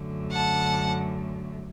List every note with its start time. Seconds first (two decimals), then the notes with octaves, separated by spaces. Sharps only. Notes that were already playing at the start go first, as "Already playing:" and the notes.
Already playing: F#2 D3 A3
0.31 F#5 A5